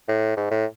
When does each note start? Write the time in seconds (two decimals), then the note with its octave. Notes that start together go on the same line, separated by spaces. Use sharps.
0.08 A2
0.37 G#2
0.51 A2